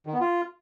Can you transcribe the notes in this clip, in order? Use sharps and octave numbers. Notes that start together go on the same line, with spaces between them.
D#3
B3
F4